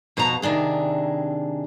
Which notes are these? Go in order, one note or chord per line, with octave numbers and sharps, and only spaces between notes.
F2 B2 F#4 A5 A#5
C3 D#3 D4 G#4